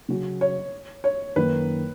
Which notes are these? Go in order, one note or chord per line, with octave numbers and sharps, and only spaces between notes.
C#3 F#3 C#4 F#4
C#5
C#5
F#2 D#3 A#3 D#4 B4